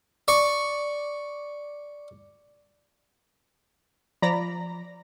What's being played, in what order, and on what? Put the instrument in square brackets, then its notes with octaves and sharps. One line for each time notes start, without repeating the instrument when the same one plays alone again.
[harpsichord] D5 C#6
[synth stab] F3 D5 A#5 B5 A#6